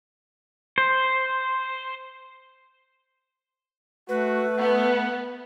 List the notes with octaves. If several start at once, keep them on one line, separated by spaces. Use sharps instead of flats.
C5
A3 F#4 B4
B3 F#5